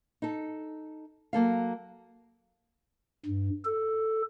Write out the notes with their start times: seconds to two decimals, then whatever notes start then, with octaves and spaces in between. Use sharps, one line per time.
0.22 D#4 A4
1.33 F#3 A#3 A4 F5
3.26 G2
3.65 A4